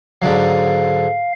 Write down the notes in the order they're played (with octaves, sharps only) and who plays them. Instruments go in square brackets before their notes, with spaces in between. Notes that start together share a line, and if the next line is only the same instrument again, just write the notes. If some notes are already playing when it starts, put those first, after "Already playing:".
[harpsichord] G#2 D3 F#3 [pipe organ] F5